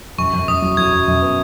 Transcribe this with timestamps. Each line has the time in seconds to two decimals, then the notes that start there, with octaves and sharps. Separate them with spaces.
0.18 F#2 C#6
0.33 F#2
0.48 F#2 D#6
0.62 F#3
0.77 F#3 G#6
0.92 F#2
1.08 F#2
1.22 B3